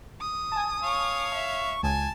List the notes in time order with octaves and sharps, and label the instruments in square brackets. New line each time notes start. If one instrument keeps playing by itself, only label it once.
[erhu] D#6
[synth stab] G#5 A5
[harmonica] C#5 F5 C#6
[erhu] E5
[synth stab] C#2 [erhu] G#5 [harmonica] A5